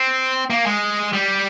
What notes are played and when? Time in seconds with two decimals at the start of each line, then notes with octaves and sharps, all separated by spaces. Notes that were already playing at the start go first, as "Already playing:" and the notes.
Already playing: C4
0.50 A#3
0.66 G#3
1.13 G3